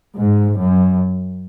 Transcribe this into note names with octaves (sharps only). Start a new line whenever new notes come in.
G#2
F#2